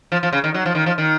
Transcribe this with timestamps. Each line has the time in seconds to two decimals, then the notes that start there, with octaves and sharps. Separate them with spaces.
0.12 F3
0.23 F3
0.33 C#3
0.44 D#3
0.54 F#3
0.66 F3
0.75 D#3
0.86 F3
0.98 D#3